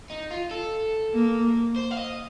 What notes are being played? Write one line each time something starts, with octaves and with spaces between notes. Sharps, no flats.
D#4
F4
A4
A#3
C5
F5
D#5